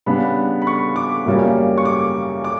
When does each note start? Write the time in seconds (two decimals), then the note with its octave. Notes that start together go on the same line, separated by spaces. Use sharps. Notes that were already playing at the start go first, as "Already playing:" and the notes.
0.06 C#3 G3 B3 D4 B5
0.62 B5
0.67 C#6
0.96 D6
1.26 F#2 C#3 G3 A#3 C#4
1.78 C#6
1.85 D6
2.44 D6